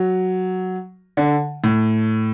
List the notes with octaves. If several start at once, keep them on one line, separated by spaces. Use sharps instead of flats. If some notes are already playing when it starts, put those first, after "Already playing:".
Already playing: F#3
D3
A2